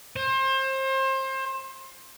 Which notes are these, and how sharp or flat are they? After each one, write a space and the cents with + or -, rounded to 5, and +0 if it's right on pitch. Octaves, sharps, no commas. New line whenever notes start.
C5 +30